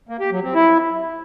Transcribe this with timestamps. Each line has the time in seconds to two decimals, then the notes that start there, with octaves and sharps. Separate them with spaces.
0.09 A#3
0.20 G4
0.32 F#3
0.43 C4
0.55 E4